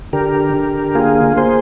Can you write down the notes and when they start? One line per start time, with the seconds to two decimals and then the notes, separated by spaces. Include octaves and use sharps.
0.13 D3 G4 A#4
0.54 D3
0.95 A#3 F4 G#4
1.36 A#3 G#4 C5